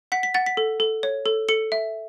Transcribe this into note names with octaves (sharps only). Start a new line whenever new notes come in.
F#5 B6
B6
F#5 A6
B6
A4
A4
C#5
A4
A4 C#7
E5